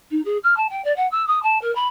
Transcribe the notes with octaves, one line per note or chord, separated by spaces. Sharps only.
D#4
G#4
F6
A5
G5
D5
F#5
E6
D#6
A5
A#4
B5